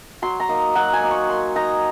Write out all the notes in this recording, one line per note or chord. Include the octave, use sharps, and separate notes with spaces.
F#3 C6
A#5
A#3 D#4
F#3 F#5
G#5
A#3 D#4
C#6
A#3 C6
D#4 A#5